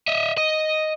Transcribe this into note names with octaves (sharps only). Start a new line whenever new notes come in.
D#5 E5
D#5